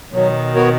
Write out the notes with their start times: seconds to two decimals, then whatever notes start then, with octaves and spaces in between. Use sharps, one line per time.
0.13 B2 D#3 F#3
0.55 B3 F#4 A#4 C#5